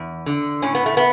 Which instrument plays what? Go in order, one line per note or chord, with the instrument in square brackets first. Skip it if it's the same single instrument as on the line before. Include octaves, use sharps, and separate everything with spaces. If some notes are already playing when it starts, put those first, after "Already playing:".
Already playing: [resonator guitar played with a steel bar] E2
D3
A2 C#4
B3
A3
B3